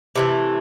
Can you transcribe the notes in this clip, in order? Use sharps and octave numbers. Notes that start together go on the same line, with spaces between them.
C3 E3 A3